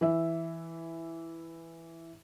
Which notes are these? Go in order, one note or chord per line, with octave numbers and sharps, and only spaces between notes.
E3 E5